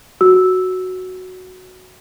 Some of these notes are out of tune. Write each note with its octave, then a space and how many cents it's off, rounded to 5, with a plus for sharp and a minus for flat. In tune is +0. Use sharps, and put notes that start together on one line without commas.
F#4 +0 E6 -5